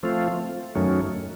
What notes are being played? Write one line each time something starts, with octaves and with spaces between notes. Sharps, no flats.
F3 A3 C4 F4
F#2 D#3 F#3 A3 C#4